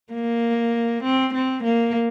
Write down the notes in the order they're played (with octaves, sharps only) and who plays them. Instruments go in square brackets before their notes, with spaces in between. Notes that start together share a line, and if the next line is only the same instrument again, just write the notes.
[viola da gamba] A#3
C4
C4
A#3